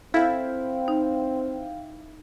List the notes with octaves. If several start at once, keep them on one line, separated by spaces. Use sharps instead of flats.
C4 E4 A4 F5 G5
D#4